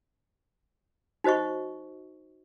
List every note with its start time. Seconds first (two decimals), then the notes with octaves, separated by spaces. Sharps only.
1.24 D#4 F#4 C5 D#5 C#6